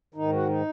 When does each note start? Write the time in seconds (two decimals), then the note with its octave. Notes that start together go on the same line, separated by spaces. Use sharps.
0.14 G#2 D#3 D#4
0.32 F#4
0.49 D#4